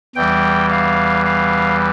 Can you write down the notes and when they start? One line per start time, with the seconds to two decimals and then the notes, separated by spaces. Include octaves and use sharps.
0.15 E2 E3 G3 G5
0.71 F5
1.26 F5